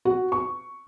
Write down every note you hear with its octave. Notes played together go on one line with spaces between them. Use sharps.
F#4
C#6